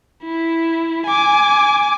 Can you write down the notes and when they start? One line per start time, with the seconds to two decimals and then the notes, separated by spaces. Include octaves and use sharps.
0.24 E4
1.06 G#5 D6